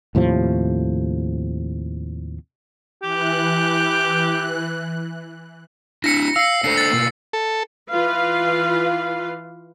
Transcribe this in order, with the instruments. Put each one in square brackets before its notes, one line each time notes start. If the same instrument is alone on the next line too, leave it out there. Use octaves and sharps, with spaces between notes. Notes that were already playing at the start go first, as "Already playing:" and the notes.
[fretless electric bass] D#2 A2 C3 F3
[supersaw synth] E3 F#6 [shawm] G4
[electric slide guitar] D4 E4 [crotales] A#6 C#7
[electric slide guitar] F5 [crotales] E6 C7
[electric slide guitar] D4 A4 C5 [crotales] C7
[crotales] A6
[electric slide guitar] B2 A#3
[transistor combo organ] A4
[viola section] E3 F4 B4 F5